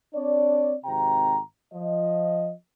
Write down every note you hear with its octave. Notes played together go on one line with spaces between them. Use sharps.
C4 D4 C#5 D5
G#1 C3 G5 A#5
F3 D#5